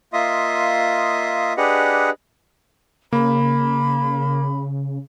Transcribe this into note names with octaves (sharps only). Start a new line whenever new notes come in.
A#3 F4 D#5 E5 C6 D#6
D4 G4 G#4 B4 D#5 F#5
C#3 A#3 B5